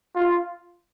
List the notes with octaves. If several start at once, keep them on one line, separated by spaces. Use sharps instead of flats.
F4